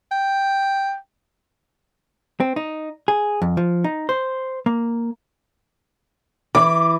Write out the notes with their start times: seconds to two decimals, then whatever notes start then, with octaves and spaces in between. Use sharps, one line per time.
0.11 G5
2.40 C4
2.56 D#4
3.08 G#4
3.42 F2
3.57 F3
3.84 D#4
4.09 C5
4.66 A#3
6.55 E3 D6